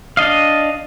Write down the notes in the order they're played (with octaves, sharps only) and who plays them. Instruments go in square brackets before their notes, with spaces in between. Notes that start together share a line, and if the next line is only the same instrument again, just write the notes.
[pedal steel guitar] D4 D#5 F5